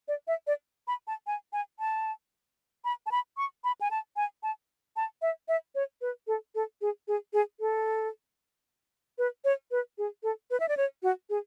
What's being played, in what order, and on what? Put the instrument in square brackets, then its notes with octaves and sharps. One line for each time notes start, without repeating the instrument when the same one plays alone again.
[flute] D5
E5
D5
B5
A5
G#5
G#5
A5
B5
A5
B5
C#6
B5
G#5
A5
G#5
A5
A5
E5
E5
C#5
B4
A4
A4
G#4
G#4
G#4
A4
B4
C#5
B4
G#4
A4
B4
E5
D5
C#5
F#4
G#4